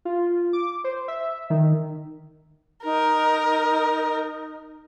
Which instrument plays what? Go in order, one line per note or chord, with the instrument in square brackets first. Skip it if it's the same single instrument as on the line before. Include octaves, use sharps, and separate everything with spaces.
[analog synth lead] F4
D6
C5
E5
D#3
[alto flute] D#4 [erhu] A#4